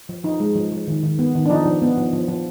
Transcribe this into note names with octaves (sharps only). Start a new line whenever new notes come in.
F3
F3 D#4
G#3
F3
F3
D#3
D#3
B3
D#3
D4
F3 D#4
F3
B3
F3
F3
F3